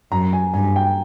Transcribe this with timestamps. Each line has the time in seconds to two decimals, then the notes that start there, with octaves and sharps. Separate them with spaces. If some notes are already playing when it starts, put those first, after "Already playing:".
0.12 F#2 A#5
0.33 G#5
0.54 G2 G#5
0.76 G5